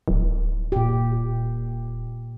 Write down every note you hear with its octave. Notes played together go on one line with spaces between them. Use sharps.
D1
A#2 G4